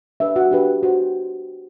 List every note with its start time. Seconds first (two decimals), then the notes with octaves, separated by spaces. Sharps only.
0.20 D4 G4 B4 E5
0.36 F#4 F#5
0.51 D4 G4 B4
0.83 F#4 C5